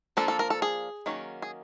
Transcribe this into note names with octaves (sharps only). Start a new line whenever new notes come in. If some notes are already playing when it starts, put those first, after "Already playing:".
F3 A#3 D4 A4
A4
A#4
A4
G#4
D#3 F#3 A#3 C#4
G#4